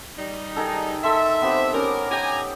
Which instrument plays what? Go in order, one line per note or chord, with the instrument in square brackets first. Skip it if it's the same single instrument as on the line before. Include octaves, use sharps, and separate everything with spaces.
[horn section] G3 D#4
[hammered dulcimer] D#3 G#4 A4
[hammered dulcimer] A4 C6 [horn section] E5
[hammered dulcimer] B3 C4 G4
[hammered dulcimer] C#4 G4 D6 [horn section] A#4
[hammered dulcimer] G4 G5 [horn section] G#5 A#5